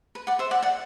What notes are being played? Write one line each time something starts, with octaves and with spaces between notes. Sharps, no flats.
B4
D5 F#5
C5 E5
D5 F#5
D5 F#5